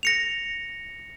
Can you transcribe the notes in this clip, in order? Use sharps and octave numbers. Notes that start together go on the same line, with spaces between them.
A#6 C#7 F7